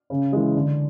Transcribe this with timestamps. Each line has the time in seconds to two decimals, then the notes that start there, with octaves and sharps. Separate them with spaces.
0.10 C#3
0.32 E3 G#3
0.55 D3